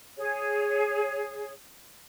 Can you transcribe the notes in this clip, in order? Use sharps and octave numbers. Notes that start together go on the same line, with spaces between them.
G#4 C#5